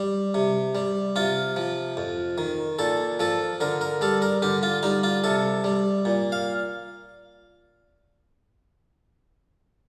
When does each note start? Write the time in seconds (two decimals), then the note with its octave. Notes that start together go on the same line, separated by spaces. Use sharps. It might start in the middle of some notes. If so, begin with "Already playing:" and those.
Already playing: G3
0.34 C3
0.75 G3
1.16 C3 F4
1.56 F3
1.97 F2
2.38 D#3
2.79 A#2 A4
3.20 F3 A4
3.60 D3 A#4
3.81 A#4
4.01 G3 A4
4.22 A#4
4.42 D3 G4
4.63 F4
4.83 G3 D#4
5.03 F4
5.24 C3 A4
5.64 G3
6.05 A#2
6.32 F5